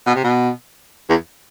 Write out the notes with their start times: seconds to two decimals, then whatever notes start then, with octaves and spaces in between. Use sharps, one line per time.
0.06 B2
0.15 C3
0.24 B2
1.10 E2